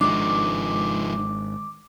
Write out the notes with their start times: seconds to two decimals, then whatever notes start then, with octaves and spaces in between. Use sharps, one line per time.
0.01 G#1 F3 G#3 D4 D#4 D6